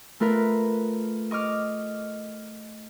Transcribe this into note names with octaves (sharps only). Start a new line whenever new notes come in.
A3 F4 A#4 B4
D#5 C#6 D6 F6